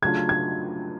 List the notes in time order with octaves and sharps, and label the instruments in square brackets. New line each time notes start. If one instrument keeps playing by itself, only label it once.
[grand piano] C#3 F#3 A3 D4 F4 [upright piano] G#6
[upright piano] G#6